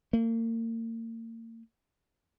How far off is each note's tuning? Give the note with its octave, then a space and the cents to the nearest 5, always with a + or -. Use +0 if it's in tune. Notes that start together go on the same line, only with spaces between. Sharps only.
A#3 -40